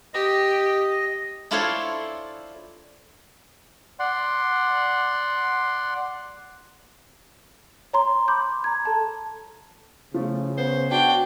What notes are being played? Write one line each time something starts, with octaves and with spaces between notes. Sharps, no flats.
G4 D#5
D4 E4 F4 A4 C5 C#5
D5 F#5 C6
C#5 A#5 C6
B5 C6 D6 G6
A#5 G#6
A4 A5
C#3 F3 A3
B3 C5
D4 F#4 G5